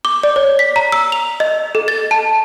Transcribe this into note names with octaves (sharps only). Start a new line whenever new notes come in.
D6
D5
C#5
B6
A#5
E6
F7
D#5
A4
A6
A5